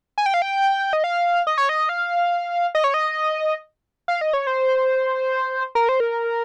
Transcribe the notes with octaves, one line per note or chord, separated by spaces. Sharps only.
G#5
G5
F5
G5
D#5
F5
D#5
C#5
D#5
F5
D#5
C#5
D#5
F5
D#5
C#5
C5
A#4
C5
A#4